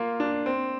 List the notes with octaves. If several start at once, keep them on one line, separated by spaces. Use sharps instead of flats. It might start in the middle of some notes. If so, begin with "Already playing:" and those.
Already playing: A#3 F4
D4
C4